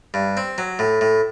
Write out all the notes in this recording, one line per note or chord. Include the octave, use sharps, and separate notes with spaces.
G2
C4
F#3
A2
A2